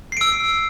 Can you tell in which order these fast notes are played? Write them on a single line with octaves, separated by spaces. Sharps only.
C7 D7 E6